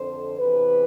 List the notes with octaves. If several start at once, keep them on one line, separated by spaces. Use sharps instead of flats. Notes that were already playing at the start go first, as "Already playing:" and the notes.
Already playing: F2 D3 C5
E2 C3 E3 B4